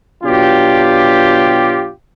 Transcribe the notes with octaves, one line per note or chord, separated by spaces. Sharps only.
B2 F#3 D4 F4 G4